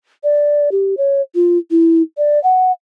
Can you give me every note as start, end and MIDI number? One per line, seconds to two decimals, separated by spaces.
0.24 0.69 74
0.72 0.95 67
0.98 1.21 73
1.35 1.58 65
1.71 2.02 64
2.18 2.42 74
2.44 2.72 78